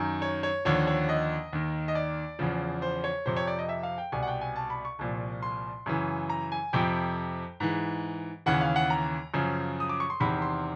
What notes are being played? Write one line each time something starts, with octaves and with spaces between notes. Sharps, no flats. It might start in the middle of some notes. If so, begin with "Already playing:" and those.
Already playing: F#2 D#3
C#5
C#5
D#2 D3 F3 C#5
C#5
D#5
D#2 D#3
D#5
D5
E2 C#3 F3
C5
C#5
F2 C3 F3 C5
C#5
D5
D#5
E5
F5
G5
C2 B2 G#5
F#5
G5
G#5
A5
B5
C#6
C2 A#2 F3
C6
F#2 C#3 E3
A#5
G#5
F2 C3 F3 G5
G#2 E3
D#2 C#3 E3 F#5
F5
F#5
A#5
F#2 C#3 F3
D#6
D6
C#6
C6
E2 C3 D#3 B5
C6